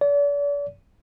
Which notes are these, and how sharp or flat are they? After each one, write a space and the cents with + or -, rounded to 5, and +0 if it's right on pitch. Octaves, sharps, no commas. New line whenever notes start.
D5 -40